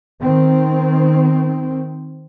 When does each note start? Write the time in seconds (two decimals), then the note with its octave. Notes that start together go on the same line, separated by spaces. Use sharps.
0.20 D#3 C4